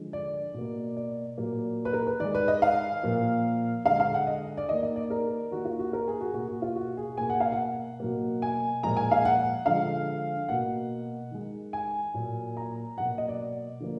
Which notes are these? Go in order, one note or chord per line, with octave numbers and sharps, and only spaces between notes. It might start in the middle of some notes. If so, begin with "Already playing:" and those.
Already playing: D3 F3 G#3
D5
B2 A#3
D5
A#2 F#3 A#3
B4
A#4
B4
D#3 G#3 D5
B4
D#5
F5
A#2 F3 A#3
D3 G#3 F5
F5
F#5
D#5
D5
D#3 A#3 D#5
D#5
D5
A#4
D#3 A#3 F#4
F4
F#4
A#4
G#4
F#4
B2 A#3 F#4
F#4
F4
F#4
G#4
B2 A#3 G#5
F#5
F5
F#5
B2 F#3 A#3
G#5
A#2 F3 G#3 A#5
G#5
F5
F#5
D3 F3 G#3 F5
B2 A#3 F#5
D#3 G#3
G#5
A#2 F#3 A#3
A#5
B2 F#3 A#3 F#5
D#5
D5
D3 F3 A#3